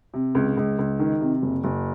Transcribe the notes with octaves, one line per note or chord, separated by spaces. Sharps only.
C3
C#2
C#2
C#2
D#3
C3
F#1
F#1